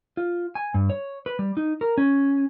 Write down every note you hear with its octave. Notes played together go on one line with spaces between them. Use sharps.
F4
G#5
G2
C#5
B4
G3
D#4
A#4
C#4